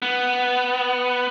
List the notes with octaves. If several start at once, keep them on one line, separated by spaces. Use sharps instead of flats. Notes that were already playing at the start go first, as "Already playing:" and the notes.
B3